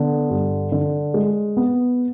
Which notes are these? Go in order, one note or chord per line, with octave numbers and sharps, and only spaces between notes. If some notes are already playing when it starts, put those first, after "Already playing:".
Already playing: D3 B3
G2
D3
G#3
B3